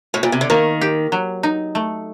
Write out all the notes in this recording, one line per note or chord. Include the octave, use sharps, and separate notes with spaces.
A2
A#2
C3
D3
D#3 A#3
G4
F#3
D#4
A3